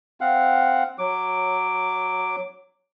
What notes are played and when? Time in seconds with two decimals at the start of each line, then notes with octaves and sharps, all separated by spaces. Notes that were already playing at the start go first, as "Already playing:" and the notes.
0.21 C4 F5 F#5
0.99 F#3 D6